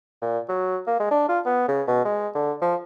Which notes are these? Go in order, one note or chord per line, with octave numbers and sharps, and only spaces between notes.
A#2
F#3
A#3
G#3
D4
F4
B3
C#3
B2
G#3
D3
F3